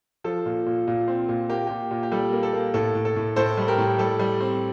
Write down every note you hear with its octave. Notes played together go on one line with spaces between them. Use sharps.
F3 A4
A#2
A#2
A#2
C4
A#2
A#3 G4
A#2 G4
A#2
G4
G3 A4
A#3
A4
A#3
A2 A4
A2
A4
A2
A2 A4 C5
G3
G4 A#4
A2
G3 A4
G3
C4